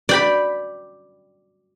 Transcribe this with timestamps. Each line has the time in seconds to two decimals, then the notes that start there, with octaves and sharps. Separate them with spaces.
0.09 D5 G5 B5